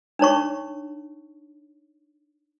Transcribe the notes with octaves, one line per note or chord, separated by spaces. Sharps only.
D4 D#4 C#5 C#6